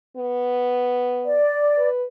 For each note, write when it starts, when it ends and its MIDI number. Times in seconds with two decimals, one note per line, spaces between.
0.17 1.41 59
1.26 1.88 74
1.77 2.04 71